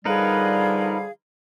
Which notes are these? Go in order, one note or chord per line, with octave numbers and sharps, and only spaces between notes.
D3 F3 G3 D#4 G#4 A#4 B4 F5